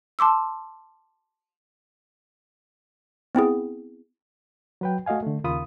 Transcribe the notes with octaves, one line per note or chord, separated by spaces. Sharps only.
A5 C6 D6 E6
B3 C4 E4 G#4
F#3 B4 G5
A3 F#4 D#5 F5 G#5
D3 A3
D#2 C#3 F4 A#4 B5 D#6